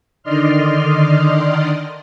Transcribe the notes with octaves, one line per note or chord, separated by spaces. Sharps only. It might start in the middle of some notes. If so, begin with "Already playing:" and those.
D3 D#3 D5 D#5 C6 F6